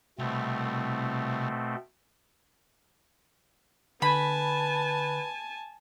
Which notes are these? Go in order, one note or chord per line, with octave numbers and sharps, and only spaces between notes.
C2 B2 A3 C4
D3 B4 G#5 A5 B5